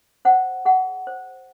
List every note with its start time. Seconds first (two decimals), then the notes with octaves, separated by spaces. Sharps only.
0.25 C5 F#5
0.65 G#4 F#5
1.07 C5